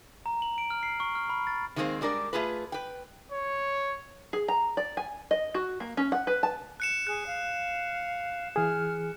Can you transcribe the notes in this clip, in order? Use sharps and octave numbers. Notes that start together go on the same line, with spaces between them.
A#5
F#7
D7
F6
C7
C#6
F6
B5
A6
D#3 F3 G#3 A#3 C4 C5
G3 G#3 D4 A#4 D5
A3 F4 G#4 B4
B4 G5
C#5
G#4
A#5
D5
G#5
D#5
F#4
A#3
C#4
F#5
B4
A5
F#6 C#7 E7
G#4 F#6
F5
E3 G#4 F6